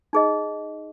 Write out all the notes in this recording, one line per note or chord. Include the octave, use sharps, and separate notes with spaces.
D#4 G#4 D#5